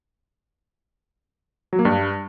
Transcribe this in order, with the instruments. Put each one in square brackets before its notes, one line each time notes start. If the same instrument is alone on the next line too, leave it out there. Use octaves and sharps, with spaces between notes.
[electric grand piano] F#3
A#3
G2